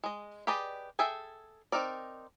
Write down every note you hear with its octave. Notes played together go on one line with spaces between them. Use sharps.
G#3 D#5
G4 G#4 B4 D5 D#5
G#4 A4 E5 G5 G#5
C4 D#4 A#4 D5